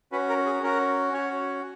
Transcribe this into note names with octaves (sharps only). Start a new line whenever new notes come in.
C#4 F#4 B4
A#4
G#4
C#4 F#4 A#4
C#4 F#4 C#5